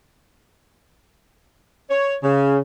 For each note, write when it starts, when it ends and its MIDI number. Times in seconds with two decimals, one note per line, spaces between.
1.90 2.16 73
2.23 2.59 49